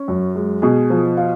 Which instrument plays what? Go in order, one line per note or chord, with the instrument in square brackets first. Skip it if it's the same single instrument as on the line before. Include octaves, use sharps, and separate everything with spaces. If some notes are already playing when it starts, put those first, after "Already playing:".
Already playing: [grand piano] C#4
F#2
G#3
[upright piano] B2 [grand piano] G#4
[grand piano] F3
F4